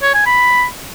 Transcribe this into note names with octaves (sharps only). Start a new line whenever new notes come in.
C#5
G#5
B5